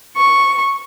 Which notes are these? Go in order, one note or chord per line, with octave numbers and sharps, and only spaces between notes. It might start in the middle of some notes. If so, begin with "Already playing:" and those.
C#6